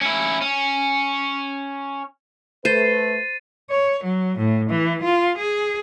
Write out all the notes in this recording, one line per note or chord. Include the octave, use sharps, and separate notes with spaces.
C#4 E4
C#4
A3 B4 C5 A6 C7 D#7
C#5
F#3
A2
E3
F4
G#4